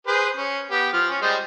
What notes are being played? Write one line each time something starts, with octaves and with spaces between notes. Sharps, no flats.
G#4 B4 C5
C#4
B3 G4
F3 F6
C#4
G3 G#3 C5